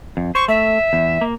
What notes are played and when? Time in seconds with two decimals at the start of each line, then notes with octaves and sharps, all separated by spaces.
0.17 F2
0.35 C5 C#6
0.48 A3 E5
0.93 E2
1.21 A#3